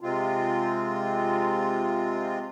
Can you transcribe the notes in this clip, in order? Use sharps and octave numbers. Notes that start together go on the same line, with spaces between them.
C3 G#3 C4 F4